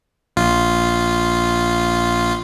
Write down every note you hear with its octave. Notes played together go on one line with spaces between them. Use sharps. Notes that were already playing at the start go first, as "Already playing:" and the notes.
A#1 F4